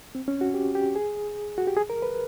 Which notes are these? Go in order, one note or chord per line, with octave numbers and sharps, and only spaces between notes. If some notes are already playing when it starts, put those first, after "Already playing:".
C4
C#4
F#4
G4
G4
G#4
F#4
G4
G#4
A#4
B4